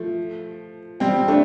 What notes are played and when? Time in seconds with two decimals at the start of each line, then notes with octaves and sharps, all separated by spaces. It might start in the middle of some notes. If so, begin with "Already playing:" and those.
Already playing: F3 A3
1.00 G3 C4
1.28 A3 D4